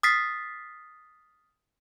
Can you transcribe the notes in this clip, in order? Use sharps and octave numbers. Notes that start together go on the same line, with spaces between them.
D#6 F6 A6 B6 C7